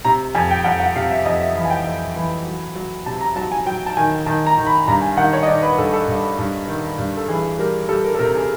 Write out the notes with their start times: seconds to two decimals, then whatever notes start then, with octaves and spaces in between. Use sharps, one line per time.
0.05 C3 A#5
0.35 F2 G#5
0.50 G5
0.64 F2 F#5
0.80 F#5
0.96 C3 F5
1.10 E5
1.25 F2 D#5
1.40 E5
1.56 E3 F5
1.65 G#5
1.70 G5
1.85 F2
2.16 E3
2.46 F#3
2.75 F#3
3.06 C3 A5
3.21 A#5
3.36 F#3 A5
3.52 G#5
3.66 F#3 G5
3.86 A5
3.97 D#3 G#5
4.26 D#3 A5
4.46 A#5
4.57 D#3
4.67 B5
4.88 G2 A#5
5.02 G#5
5.17 D#3 F#5
5.33 C#5
5.43 D#5
5.47 D#3 D5
5.63 B4
5.78 G2 A4
5.93 A4
6.08 G2
6.38 G2
6.68 D#3
6.98 G2
7.17 A4
7.28 E3 G#4
7.59 G3 A#4
7.89 G3 A4
8.04 A#4
8.14 A4
8.19 C3 A#4
8.35 G#4